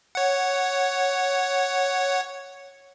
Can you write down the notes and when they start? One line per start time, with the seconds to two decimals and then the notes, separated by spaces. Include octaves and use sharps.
0.15 C#5 F#5